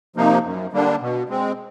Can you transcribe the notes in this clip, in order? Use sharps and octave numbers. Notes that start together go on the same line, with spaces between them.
C3 F3 A#3 D#4
F#2
D3 G3 A#3 D4
B2
G#3 C4